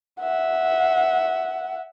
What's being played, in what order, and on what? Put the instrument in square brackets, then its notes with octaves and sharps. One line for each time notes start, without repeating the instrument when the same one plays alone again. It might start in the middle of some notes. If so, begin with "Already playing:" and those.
[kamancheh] E5 F#5